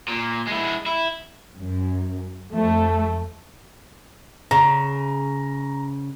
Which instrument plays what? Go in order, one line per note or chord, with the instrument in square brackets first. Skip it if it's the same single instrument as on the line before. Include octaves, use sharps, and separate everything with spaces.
[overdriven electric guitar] A#2
G#3 E4
E4
[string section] F#2
F2 A3
[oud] C#3 [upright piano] A#5